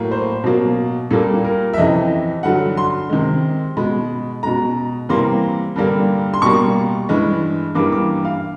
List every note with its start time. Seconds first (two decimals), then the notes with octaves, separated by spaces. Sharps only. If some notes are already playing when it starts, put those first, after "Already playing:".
Already playing: A2 F#3 A#3
0.11 C5
0.44 B2 F#3 A#3
1.11 A#2 G3 A#3 A4
1.44 A#4
1.74 E5
1.77 F2 C3 E3 D#5
2.43 G2 D3 F#3 F#5
2.77 C6
3.09 C3 D#3 G#3
3.77 B2 G#3 B5
4.43 B2 G#3 A#5
5.09 C3 E3 G3 A#3 C6
5.76 G2 D3 G3 A#3
6.34 C6
6.42 B2 G3 A#3 C#6
7.09 G2 E3 G#3
7.75 G2 E3 G3 A#3 D6
7.92 D6
8.25 F5